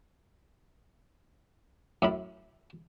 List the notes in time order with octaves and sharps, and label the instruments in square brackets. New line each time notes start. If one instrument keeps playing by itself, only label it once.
[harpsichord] F#2 A2 B5